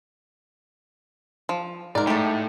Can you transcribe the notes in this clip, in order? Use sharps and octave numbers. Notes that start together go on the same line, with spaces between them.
F3
G#2 A#4 D5
A2 A3 G4